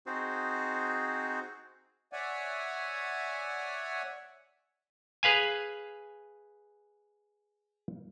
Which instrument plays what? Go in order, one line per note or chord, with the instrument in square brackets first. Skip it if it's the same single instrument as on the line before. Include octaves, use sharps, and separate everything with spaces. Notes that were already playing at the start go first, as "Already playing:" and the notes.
[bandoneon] C4 D#4 F#4 G#4 C5
[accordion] C#5 D5 E5 F#5 G#5
[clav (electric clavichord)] G#4 B4 F5 G#5